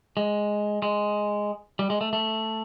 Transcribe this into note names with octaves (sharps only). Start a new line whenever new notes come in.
G#3
G#3
G3
G#3
A3
A3